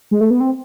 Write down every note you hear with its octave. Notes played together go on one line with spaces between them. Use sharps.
G#3
A3
B3
C4